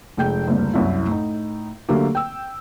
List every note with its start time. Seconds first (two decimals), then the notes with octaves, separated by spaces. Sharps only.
0.17 F1 G#3 G5 G6
0.47 F#1 D2 G2
0.73 C2 F#2 E4
1.06 A2 D#4
1.89 D3 F#3 A3 A#3 G4
2.15 G5 E6